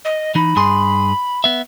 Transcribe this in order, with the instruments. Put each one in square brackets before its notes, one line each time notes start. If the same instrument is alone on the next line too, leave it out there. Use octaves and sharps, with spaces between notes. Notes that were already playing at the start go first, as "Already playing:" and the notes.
[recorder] D#5
[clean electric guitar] E3 D#4 [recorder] B5
[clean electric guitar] G2 G#4 C6
B3 E5